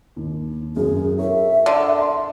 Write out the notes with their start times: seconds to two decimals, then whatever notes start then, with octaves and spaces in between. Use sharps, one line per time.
0.16 D#2
0.76 F#2 G#4
1.18 A#4 C#5 E5
1.66 D3
1.99 C6